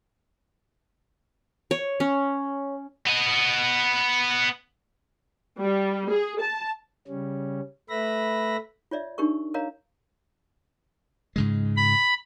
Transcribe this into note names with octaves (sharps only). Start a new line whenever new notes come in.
C#5
C#4
B3 D#5
G3
G#4
A5
C#3 G3 C#4
A3 B4 E5 B5 A#6
F4 C#5 D5 E5
D4 D#4 G4 A#4 C#6
A#4 C#5 D#5 F5 A#5
G#2 C#3 G#3
B5